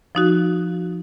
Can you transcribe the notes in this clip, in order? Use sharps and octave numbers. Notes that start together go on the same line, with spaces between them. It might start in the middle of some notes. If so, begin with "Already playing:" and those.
F3 D#4 F#4